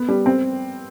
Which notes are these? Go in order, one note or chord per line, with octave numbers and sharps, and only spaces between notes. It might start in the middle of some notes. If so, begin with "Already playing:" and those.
Already playing: B3
G3
C4